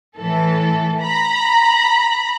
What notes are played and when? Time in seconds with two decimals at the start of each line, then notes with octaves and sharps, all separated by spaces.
0.17 A2 E3 A4
1.01 A#5 B5